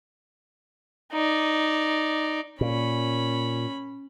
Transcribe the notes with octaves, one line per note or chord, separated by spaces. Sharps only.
D#4 D5
A#2 C#4 B5